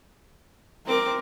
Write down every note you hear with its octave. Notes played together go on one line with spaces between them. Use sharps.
C4 A#4 D6